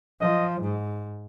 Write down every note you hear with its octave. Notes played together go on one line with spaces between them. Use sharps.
F3 D#5
G#2